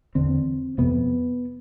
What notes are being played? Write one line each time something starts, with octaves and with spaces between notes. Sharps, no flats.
E2 D3 C4
F2 C3 B3